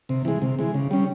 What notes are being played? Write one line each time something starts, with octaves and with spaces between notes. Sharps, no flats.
C3
E3 G#3
C3
E3 G#3
C#3
G3 C#4